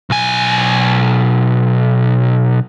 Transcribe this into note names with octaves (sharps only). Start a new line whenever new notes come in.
B1 G#5